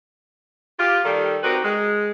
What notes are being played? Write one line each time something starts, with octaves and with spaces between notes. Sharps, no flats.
F4 G4
D#3 G3 A4
C4 D#4 F#4 G4 A#4 B4
G#3